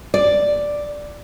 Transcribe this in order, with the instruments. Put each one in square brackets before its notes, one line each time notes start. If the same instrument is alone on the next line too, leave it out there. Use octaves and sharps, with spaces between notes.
[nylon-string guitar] D5